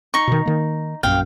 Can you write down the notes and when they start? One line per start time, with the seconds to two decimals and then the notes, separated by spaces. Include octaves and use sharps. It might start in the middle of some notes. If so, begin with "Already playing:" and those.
0.14 D#4 C#6
0.27 B2 D#3
0.46 D#3 A#3
1.03 A#1 F#2 F5 G5